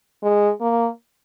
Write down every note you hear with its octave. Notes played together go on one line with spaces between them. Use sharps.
G#3
A#3